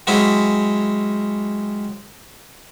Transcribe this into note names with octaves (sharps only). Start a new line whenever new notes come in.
F#3 G#3 C4 C#4 E4